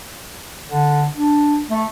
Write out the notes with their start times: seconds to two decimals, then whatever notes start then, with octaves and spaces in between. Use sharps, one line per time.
0.68 D3
1.15 D4
1.70 A3